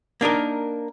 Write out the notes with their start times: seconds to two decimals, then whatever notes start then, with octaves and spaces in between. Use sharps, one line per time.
0.21 A#3 D4 D#4 A#4